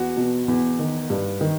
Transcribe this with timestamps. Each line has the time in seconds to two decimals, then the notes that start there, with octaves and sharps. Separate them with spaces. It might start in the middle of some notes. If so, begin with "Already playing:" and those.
Already playing: E2 F#4
0.17 B2
0.48 E2
0.79 D#3
1.10 G2
1.41 D#3